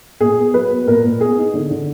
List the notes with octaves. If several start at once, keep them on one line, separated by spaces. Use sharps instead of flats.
A#2 G#4
B3
F#3 B4
B3
A#2 A#4
A#2
B3 G#4
D#4
D3
D3